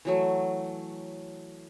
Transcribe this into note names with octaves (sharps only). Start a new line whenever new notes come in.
E3 F#3 A3